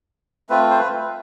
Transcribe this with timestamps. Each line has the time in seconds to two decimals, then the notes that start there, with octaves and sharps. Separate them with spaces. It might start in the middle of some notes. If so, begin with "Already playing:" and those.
0.50 A3 C4 F4 B4
0.71 C5
0.79 B4